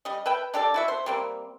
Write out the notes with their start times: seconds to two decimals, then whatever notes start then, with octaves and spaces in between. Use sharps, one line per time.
0.05 G3 D#5
0.26 B4 E5 G5
0.54 D4 G4 A4 D5
0.74 E4 F#4 E5
0.88 C5
1.06 G3 A#3 C4